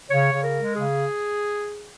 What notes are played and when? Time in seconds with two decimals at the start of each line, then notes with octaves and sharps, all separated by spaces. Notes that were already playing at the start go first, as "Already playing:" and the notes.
0.10 C#3 C#5
0.33 C#3
0.44 A#4
0.55 G#3
0.76 C#3 G#4